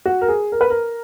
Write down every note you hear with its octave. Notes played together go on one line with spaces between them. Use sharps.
F#4
A#4
G#4
A#4
B4
A#4